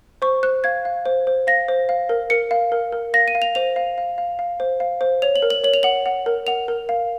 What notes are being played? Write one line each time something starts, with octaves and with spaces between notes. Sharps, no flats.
C5 C#6
C5 F#6
F5 G#6
F5
C5
C5
F5 A#6
C5
F5
A#4
A#4 C#7
F5
A#4
A#4
F5 A#6
D#7
F5
F7
C5 F7
F5
F5
F5
F5
C5
F5
C5
C#5 F7
F#7
A#4
F#7
C#5 F#7
F7
F#5 F#7
F#5
A#4
F#5 F7
A#4
F5